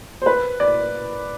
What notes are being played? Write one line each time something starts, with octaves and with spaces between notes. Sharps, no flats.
C5
B4
D5